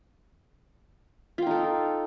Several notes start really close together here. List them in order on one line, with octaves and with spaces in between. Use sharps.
F4 G5 D#4 A4